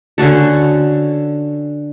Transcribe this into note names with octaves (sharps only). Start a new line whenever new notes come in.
D3 C#4 F#4 A4